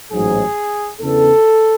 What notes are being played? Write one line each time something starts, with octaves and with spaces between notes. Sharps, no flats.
A1 G#2 F#3 G#4
E2 C#3 E3 B3 D4 A4